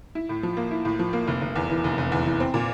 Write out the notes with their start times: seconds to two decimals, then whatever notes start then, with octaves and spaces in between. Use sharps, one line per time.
0.15 E4
0.29 A2
0.43 F3
0.57 A#3
0.71 E4
0.85 A2
0.99 F3
1.13 A#3
1.27 F1
1.42 F1
1.56 E2
1.70 E3
1.84 F1
1.98 F1
2.12 E2
2.26 E3
2.40 C4
2.54 A#2